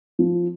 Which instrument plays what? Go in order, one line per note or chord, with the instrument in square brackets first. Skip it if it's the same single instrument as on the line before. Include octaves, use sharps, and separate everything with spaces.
[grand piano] F3